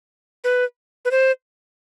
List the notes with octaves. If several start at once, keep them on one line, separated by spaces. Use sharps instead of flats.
B4
B4
C5